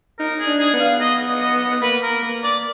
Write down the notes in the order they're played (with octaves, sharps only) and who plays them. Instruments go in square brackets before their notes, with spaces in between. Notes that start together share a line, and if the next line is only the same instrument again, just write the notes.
[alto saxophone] D#4 [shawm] A#4
[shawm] G#4
[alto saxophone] D4
[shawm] G#4
[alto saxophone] B3
[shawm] F5
D#5
D#5
[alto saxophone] A#3 [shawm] B4
[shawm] A#4
[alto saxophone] A#3
[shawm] D5